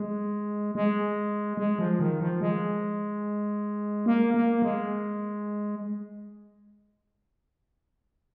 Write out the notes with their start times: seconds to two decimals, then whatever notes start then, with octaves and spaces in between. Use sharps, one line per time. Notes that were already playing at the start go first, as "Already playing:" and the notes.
Already playing: G#3
0.75 G#3
1.57 G#3
1.79 F3
2.00 D#3
2.20 F3
2.40 G#3
4.06 A#3
4.34 A#3
4.62 G#3